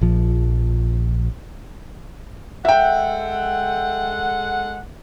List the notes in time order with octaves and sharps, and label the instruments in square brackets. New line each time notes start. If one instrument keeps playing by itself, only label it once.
[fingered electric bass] A#1 F3
[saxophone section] G#3 A4 F#5 [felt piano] E5 G5